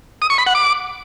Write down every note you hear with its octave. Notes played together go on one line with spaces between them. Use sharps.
D#6
C#6
B5
F#5
D6